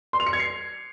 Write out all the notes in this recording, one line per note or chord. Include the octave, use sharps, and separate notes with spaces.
C6
F7
C#7
G#6
C7